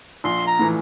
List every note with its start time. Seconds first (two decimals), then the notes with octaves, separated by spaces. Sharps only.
0.24 A#1 C6
0.47 A#5
0.59 A2 E3